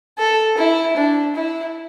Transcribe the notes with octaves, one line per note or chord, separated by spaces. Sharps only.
A4
E4
D4
E4